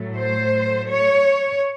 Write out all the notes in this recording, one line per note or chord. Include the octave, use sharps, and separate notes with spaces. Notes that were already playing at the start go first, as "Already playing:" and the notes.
Already playing: A2 F#3 A3
C5
C#5